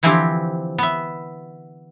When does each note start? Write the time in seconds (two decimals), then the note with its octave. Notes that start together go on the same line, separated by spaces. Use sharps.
0.03 D3 E3 F3 C4 E4 G4
0.78 B3 E5